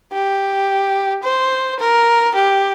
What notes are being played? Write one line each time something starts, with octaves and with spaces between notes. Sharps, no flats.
G4
C5
A#4
G4